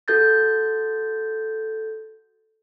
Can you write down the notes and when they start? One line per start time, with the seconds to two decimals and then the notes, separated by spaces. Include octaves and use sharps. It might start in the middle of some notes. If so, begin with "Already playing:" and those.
0.08 F#4 A4 G6 A6